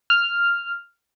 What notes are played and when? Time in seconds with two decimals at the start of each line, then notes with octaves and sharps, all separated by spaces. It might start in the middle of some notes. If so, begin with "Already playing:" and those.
0.10 F6